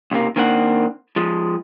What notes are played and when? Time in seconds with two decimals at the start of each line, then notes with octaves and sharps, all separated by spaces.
0.11 C#2 G#2 C3 A#3
0.36 D#3 A#3 C4 D4 F#5
1.16 F3 G#3